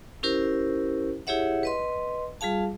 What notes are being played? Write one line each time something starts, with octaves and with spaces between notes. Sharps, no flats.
C#4 E4 G4 A#4 C5
E4 G4 G#4 C#5 E5 F#5
B4 D#5 C6
G3 F4 G#4 F5 A5